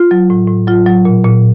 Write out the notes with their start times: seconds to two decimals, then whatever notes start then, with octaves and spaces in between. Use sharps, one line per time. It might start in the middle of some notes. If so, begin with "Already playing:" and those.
Already playing: F4
0.11 F#3
0.30 A2
0.48 A2
0.67 F#3 F4
0.86 F#3
1.05 A#2
1.25 A#2